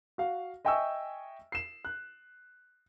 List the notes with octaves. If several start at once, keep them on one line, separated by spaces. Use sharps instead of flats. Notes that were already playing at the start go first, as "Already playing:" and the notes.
F#4 F5
D#5 E5 G5 G#5 C#6 E6
C7 E7
F#6